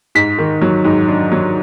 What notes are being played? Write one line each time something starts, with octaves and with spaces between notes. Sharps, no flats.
G#2 B6
D#3
F#3
G#2
D4
F#3